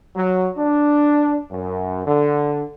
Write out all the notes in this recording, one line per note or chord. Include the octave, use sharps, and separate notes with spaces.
F#3
D4
F#2
D3